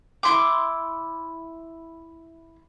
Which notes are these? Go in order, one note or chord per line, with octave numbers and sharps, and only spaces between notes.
E4 C6 D6